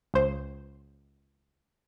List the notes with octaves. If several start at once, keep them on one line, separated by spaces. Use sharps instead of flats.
C#2 C5